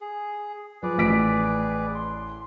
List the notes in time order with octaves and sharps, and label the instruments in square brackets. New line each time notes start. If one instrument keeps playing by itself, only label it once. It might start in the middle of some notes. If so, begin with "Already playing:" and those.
[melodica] G#4
[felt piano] F3 [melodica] G#4 B4 D5
[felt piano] A1 B6 D7
[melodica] C6